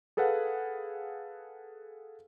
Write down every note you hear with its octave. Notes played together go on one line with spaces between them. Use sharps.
G#4 A4 B4 F5 F#5